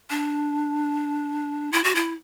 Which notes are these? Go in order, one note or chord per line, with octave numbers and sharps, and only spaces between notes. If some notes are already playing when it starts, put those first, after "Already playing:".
D4
E4
F#4
E4